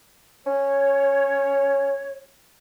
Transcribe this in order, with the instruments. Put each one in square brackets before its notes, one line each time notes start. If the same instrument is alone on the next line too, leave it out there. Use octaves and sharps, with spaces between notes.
[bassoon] C#4 [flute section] C#5